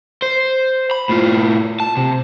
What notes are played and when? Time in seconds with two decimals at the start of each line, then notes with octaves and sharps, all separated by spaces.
0.22 C5
0.91 B5
1.09 A2 F4
1.80 A5
1.97 C3